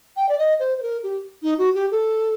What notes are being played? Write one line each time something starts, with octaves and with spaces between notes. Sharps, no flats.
G5
D5
D#5
C5
C5
A#4
G4
D#4
F#4
G4
A4